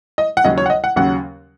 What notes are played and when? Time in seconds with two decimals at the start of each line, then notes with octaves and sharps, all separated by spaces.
0.18 D#5
0.37 F#5
0.44 D#2 C#3 F#3 C#4 D#5
0.58 C#5
0.66 F#5
0.70 D#5
0.84 F#5
0.96 D#2 C#3 F#3 C#4 F#5